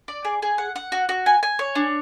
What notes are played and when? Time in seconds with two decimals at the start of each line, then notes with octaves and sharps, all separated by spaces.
0.08 D5
0.25 G#4
0.42 G#4
0.58 F#5
0.76 F#5
0.92 F#4
1.09 F#4
1.26 G#5
1.43 G#5
1.59 C#5
1.75 D4